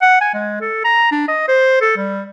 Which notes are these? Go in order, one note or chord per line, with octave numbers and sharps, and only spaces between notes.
F#5
G#5
G#3
A4
A#5
D4
D#5
C5
A4
G3